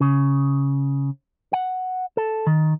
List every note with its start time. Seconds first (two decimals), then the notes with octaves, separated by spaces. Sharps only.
0.01 C#3
1.53 F#5
2.17 A4
2.47 D#3